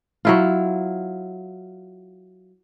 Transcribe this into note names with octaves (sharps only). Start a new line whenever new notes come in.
F#3 E4 F4